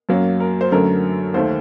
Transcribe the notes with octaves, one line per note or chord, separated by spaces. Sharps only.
F#2 F#3 A#3
A#4
C5
F#2 D3 F#3 A3 A#4
D#2 D#3 A3 C5